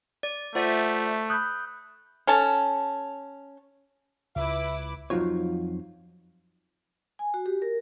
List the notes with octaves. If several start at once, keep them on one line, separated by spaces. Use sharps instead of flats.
D5
A3 F4 C5 D5 E5 F#5 A6
B5 D#6 F#6 G6
C#4 A4 A5
C#2 E4 B4 E5 D6
F2 F3 F#3 D#4 F4 C#5
G#5
F#4
G4
A#4